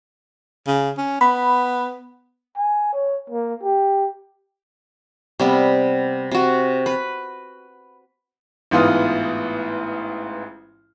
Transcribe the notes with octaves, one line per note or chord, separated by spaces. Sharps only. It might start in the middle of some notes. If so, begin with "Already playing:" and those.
C#3
C#4
B3 B5
G#5
C#5
A#3
G4
C3 G3 B3
C3 F#4
B4
A1 G#2 E3 B3 F4 D#6